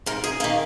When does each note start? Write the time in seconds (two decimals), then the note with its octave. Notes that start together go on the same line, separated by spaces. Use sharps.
0.06 G#2 A#4
0.24 G#4
0.40 A#3 G#4
0.44 D#3